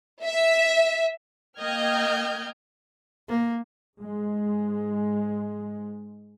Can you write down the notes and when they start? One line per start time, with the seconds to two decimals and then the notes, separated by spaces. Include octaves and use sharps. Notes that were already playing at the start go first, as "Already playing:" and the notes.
0.24 E5
1.60 A#3 D#5 G5 F6 G6 G#6
3.29 A#3
3.99 G#2 G#3